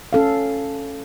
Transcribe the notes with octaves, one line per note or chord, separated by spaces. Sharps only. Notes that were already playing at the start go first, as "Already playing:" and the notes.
C#4 A4 F5